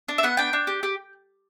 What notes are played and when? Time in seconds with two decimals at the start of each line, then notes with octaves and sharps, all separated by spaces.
0.08 D4
0.18 E5
0.23 B3 F#5
0.37 D4 G5
0.53 D4
0.67 G4
0.83 G4